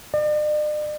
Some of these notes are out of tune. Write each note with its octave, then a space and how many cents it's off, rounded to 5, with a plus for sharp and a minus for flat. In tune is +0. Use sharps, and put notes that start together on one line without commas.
D5 +45